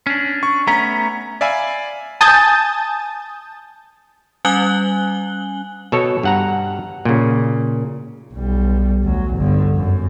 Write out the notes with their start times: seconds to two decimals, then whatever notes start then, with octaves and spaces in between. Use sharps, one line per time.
0.07 C#4 D4
0.43 C#6
0.68 A3 B3 C#4 A#5
1.41 D5 E5 F5 G#5 B5
2.21 G#5 A5 D#6 G6 A6
4.45 G3 C#4 G#5 F#6 F#7 G7
5.92 B2 A4 C#5
6.23 G2 F#5 A#5
7.05 A#2 C#3
8.34 B1 G3
9.05 D2 F#3
9.36 G1 D3
9.75 F#2